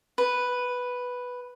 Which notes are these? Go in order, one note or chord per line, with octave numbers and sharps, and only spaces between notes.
B4